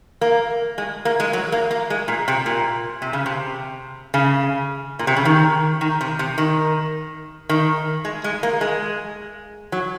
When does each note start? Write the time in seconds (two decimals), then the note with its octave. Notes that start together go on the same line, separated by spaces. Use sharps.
0.21 A#3
0.78 G#3
1.05 A#3
1.20 G#3
1.33 F#3
1.52 A#3
1.71 A#3
1.90 G#3
2.08 A#2
2.28 C3
2.46 A#2
3.02 C3
3.13 C#3
3.26 C3
4.14 C#3
4.99 A#2
5.07 C3
5.16 C#3
5.25 D#3
5.81 D#3
6.01 C3
6.19 C3
6.38 D#3
7.49 D#3
8.05 G#3
8.24 G#3
8.43 A#3
8.61 G#3
9.72 F#3